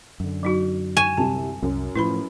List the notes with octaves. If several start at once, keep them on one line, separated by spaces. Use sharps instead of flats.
F#2 D3
F#3 D#4 F#4
G#5 C#6 D#7 E7
C2 C3 A5
C2 F#2
A2 F3 E4 B4 B5